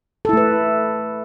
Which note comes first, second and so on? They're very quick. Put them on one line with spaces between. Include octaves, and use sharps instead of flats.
A4 E4 A3 B4